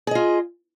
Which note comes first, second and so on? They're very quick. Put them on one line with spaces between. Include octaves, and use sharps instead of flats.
G#4 D#5 F4